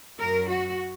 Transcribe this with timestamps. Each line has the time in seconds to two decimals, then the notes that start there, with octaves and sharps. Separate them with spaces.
0.19 F#2 F#3 A#4
0.48 F#4